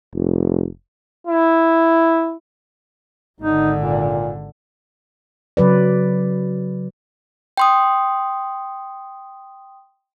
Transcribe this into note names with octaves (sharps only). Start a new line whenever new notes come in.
F1
E4
G#1 D3 D#4
A#2
C#3 F#3 B4 D5
G5 C6 D#6